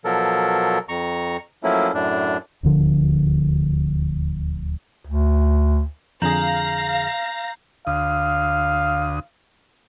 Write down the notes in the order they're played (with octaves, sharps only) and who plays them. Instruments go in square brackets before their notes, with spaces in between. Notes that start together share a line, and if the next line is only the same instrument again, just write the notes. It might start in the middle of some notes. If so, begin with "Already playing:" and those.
[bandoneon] B2 F3 F#3 A4 A#4
F2 A#5 C#6
F3 F#3 A3 A#3 C#4 E4
F#2 A2 D4
[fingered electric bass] D#1 D2 D3 F3
[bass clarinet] D2
[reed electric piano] F2 D3 G#4 [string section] F5 A#6 [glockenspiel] A#5 G6 F#7
[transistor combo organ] D2 D#6 [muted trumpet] F5